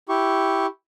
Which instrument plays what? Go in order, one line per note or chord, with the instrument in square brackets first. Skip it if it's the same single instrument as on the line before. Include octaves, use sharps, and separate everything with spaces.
[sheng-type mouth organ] E4 G4 C#6